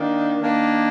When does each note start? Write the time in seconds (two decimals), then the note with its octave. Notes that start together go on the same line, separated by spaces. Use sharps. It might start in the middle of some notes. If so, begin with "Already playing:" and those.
Already playing: D#3 A#3 D4
0.39 D#3 A#3 D4